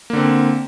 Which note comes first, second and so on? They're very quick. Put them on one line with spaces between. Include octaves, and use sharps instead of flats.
A#3 D3 C4